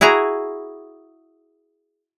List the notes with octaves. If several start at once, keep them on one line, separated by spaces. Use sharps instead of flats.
E4 F#4 G#4 A#5